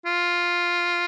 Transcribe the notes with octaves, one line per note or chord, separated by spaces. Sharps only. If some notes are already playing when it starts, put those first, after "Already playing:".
F4